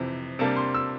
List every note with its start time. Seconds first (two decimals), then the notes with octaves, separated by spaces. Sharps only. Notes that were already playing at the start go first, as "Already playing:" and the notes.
Already playing: F2 C3 E3
0.39 C3 G3 A#3 D4 A5
0.56 C6
0.74 E6